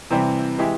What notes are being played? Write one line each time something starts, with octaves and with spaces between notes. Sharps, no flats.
C3 E3 G3 C4
E3 G#3 E4 G4